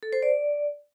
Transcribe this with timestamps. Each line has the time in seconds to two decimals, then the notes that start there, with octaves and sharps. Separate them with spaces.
0.03 A4
0.13 C5
0.23 D5